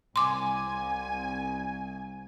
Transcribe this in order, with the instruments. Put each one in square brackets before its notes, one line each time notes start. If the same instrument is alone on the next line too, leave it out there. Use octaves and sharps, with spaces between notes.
[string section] C2 G#5 [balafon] C6 D6